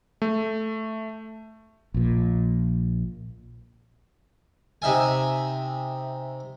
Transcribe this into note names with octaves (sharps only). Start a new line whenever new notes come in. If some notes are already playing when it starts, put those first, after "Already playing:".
A3
A#1 A#2
C3 D#4 E5 G#5